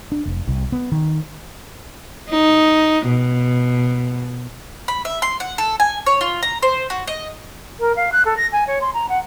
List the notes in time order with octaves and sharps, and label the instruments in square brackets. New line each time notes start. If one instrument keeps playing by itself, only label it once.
[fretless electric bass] D4
F1
C2
B3
D#3
[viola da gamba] D#4
B2
[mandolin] B5
E5
C6
F#5
A4
G#5
C#5
F4
A#5
C5
F#4
D#5
[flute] A#4
F5
F#6
A4
A#6
G#5
C#5
C6
A#5
F#5